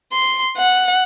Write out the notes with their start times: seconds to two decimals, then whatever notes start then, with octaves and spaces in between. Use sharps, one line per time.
0.13 C6
0.57 F#5